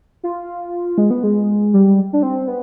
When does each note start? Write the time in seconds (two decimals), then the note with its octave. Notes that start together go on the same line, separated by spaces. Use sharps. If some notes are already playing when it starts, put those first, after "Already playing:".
0.23 F4
0.98 G#3
1.10 B3
1.24 G#3
1.74 G3
2.13 D4
2.23 C4
2.48 B3